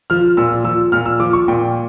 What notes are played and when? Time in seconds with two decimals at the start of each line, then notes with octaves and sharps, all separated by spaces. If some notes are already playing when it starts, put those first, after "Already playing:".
0.10 F3 F6
0.37 A#2 E6
0.64 F3 E6
0.92 A#2 F6
1.06 E6
1.20 F3 D6
1.33 C#6
1.48 A#2 G5